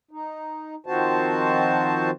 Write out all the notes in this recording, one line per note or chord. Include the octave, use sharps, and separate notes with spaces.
D#4
D#3 F3 C4 F#4 C5 A5